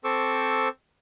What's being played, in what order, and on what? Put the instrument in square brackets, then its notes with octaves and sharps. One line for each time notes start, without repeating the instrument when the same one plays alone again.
[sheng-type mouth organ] C4 A4 C5 C#6 D6 E6